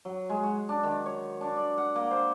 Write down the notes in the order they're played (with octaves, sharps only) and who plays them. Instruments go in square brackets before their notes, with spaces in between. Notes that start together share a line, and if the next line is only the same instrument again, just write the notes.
[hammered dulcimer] F#3
G#3
F#4
D4
D#3
C#5
D4
D5
F#5
A#3
C5